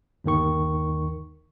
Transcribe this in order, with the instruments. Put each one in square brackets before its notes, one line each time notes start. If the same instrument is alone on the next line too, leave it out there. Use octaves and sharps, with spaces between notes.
[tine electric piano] G1 D#2 D#3 C#6